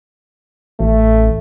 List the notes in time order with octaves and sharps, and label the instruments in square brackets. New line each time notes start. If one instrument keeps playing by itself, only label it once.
[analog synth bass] A1 [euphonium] A3